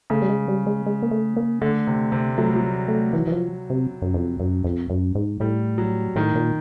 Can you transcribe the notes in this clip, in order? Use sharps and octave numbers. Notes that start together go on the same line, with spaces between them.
C#3 A3
G3
G#3
G3
G#3
G#3
A#3
A3
A#3
D3 A3
C3
C3
F#3 A3
G3
F#3
A3
E3
E3
F3
C3
F#2
F2
F#2
F2
F#2
G#2
A2 G3
F#3
A2 D#3
A#2